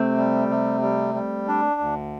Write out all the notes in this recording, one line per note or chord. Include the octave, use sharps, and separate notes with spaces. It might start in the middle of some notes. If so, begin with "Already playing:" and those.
Already playing: C3 A3 C4
G3
C3
G3
G3
D4
D2